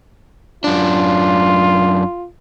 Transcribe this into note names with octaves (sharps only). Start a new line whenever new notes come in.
F#2 D4 F4